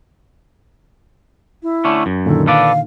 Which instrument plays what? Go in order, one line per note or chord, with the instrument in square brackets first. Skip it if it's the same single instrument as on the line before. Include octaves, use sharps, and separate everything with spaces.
[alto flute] E4
[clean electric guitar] D3 A3 C#4
F#2
[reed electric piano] A#2 D3 D#3 [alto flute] A4
[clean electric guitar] A4 B4 D5 [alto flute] F5